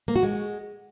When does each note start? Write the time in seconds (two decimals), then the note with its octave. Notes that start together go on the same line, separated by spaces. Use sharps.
0.08 A#3
0.16 F#4
0.23 G#3